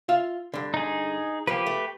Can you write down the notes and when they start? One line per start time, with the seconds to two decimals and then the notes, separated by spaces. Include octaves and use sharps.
0.09 F4 E5 F5
0.54 G2 D3
0.74 D#4 G#4
1.47 F3 A#3 G4 B4
1.66 A3